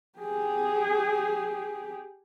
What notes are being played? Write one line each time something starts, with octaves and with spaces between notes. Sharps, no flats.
G4 G#4